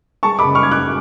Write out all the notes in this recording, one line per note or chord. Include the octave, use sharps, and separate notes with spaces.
G#3 A5 C#6
B5 D6
F#1
C#6 F6
F#2 G#6
D6 F#6